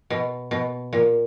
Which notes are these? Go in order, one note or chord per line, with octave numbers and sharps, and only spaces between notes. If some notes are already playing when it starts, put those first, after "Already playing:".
B2
B2
A#2